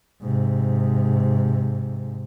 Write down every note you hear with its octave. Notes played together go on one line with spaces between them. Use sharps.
G#2 C3